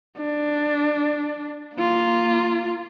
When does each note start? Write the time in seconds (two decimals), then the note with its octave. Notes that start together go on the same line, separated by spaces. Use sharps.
0.18 D4
1.75 A#3 F4